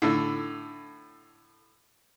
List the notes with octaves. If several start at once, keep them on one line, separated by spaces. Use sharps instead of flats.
A2 D3